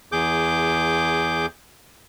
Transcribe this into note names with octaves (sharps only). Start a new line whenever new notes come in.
E2 G#4 D6 G6